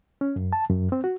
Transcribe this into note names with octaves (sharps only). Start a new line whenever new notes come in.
C#4
F#2
A5
F#2
C4
F#4